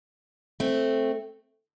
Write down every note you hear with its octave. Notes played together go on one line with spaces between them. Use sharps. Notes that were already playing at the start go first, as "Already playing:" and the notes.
A3 C4